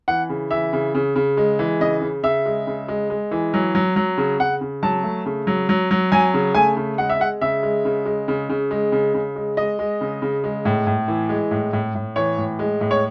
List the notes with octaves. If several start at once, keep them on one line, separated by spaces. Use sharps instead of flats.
E3 F#5
C#3
E3 E5
C#3
C#3
C#3
G#3
E3
C#3 D#5
C#3
C#3 E5
G#3
C#3
G#3
G#3
E3
F#3
F#3
F#3
C#3
C#3 F#5
C#3
F#3 A5
A3
C#3
F#3
F#3
F#3
F#3 G#5
C#3
A3 G#5
C#3
G#3 F#5
E5
G#3 F#5
C#3 E5
G#3
C#3
G#3
C#3
C#3
G#3
C#3
C#3
G#3
G#3 D#5
G#3
C#3
C#3
G#3
A2
A2
E3
G#3
A2
A2
A2
E3 C#5
A2
G#3
A2
C#5